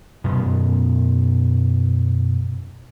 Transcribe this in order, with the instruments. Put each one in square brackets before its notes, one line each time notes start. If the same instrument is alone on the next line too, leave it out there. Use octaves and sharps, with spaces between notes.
[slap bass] F#2 B2 B3